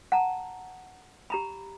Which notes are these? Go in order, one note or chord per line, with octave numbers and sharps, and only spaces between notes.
F#5 A5 A#5
G4 A#5 B5